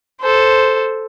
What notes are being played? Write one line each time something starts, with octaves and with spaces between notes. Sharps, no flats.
A4 C5